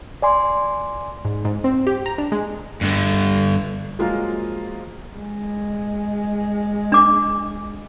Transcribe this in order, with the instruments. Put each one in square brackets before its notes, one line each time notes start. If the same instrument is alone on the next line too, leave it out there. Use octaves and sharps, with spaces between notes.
[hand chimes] D5 G#5 C6
[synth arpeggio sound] G#2
G#2
C4
G4
A#5
D4
G#3
[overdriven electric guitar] G2 D3
[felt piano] F3 F#3 G#3 A#3 F4
[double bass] G#3
[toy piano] D4 D6